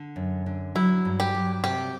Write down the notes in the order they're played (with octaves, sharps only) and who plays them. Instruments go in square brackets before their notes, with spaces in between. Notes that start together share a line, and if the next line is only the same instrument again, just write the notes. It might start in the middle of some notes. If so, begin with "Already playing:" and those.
Already playing: [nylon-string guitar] D3
F#2
D3
[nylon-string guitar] F#3 [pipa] E4
[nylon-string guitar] G2
[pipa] G4
[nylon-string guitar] F#3
[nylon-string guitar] C3 [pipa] G4